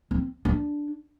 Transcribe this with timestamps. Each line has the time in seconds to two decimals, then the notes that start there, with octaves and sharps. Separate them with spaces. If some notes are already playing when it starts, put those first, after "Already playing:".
0.11 C4
0.45 D4